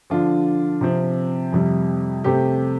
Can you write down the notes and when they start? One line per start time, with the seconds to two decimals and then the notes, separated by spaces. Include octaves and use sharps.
0.10 D3 F3 D4 F4
0.81 C3 F3 C4
1.52 F2 C3 G3
2.24 C3 A3 C4 G4